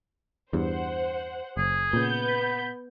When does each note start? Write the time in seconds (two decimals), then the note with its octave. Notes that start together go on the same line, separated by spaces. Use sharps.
0.53 E2 G2 C5 F#5
1.57 F#1 G#4
1.93 A#2 C#3 B3 G6
2.28 B5